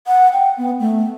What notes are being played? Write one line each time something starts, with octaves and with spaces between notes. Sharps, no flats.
F#5
G5
B3
A3